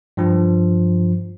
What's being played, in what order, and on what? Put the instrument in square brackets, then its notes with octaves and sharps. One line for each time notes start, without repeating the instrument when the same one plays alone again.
[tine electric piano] G2 F3